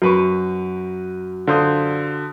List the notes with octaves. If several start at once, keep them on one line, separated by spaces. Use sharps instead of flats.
F#2 F#4 A#4 B4 C#6
D3 F4 C5 D#6